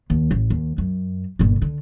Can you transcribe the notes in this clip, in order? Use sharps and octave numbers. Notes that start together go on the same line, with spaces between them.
D#2
A1
D#2
F#2
G1 A#2
D3